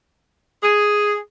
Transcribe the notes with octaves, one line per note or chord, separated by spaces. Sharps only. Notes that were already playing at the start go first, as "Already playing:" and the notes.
G#4